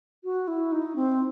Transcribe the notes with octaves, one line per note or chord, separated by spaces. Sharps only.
F#4
E4
D#4
C4